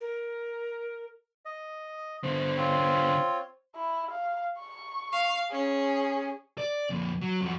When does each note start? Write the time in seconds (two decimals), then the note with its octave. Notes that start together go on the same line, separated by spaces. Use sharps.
0.01 A#4
1.45 D#5
2.24 D3 B3 C5
2.57 C4 F4 C#5
3.75 E4
4.11 F5
4.59 C#6
5.12 F5
5.51 C#4 G#4
6.58 D5
6.90 F2 A#2
7.22 F#3
7.41 F2 F#4